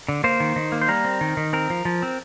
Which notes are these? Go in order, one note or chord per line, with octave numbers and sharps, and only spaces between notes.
D3
A#3 C5
D#3
D#3
A#3
C5
G3 A#4
C4
D#3
D#3
C4 A#4
F3
F3
C4